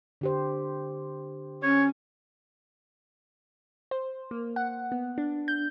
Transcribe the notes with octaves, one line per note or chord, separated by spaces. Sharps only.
D3 G4 C5
C#4 C#5
C5
A#3
F#5
B3
D4
G6